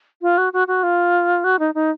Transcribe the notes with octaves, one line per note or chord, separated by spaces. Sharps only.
F4
F#4
F#4
F#4
F4
F#4
D#4
D#4